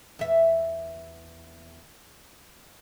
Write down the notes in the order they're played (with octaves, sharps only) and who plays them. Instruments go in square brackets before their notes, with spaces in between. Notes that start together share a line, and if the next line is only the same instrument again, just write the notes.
[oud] E2 E5